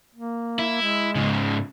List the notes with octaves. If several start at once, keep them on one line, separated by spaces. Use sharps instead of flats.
A#3
E4
G#3
G#2 C#3